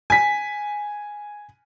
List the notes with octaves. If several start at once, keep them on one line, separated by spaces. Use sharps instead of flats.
G#5 B6